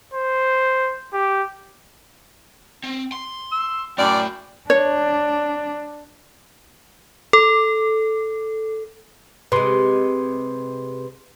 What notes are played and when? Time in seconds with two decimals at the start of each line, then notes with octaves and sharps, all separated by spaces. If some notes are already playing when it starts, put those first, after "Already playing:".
0.14 C5
1.13 G4
2.84 C4
3.12 C6
3.52 E6
3.98 F#2 A3 E4 D5 G5
4.70 D4 C#5
7.33 A4
9.52 C3 G#3 B4 C6